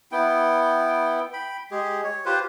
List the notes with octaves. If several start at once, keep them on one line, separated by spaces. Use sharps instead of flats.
B3 E4 G5
G5 B5
G#3 G4 G#4
C#5
F4 G4 B4 C5